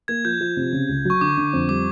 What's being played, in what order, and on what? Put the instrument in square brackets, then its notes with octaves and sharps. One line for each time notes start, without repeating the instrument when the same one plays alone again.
[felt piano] A#3 [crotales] G#6
[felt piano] F3 [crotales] G6
[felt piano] F3
C3
C#3
C#2
[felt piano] F#3 [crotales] C#6
[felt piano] D3 [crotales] D6
[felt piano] D3
F2
[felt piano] G3 [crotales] D6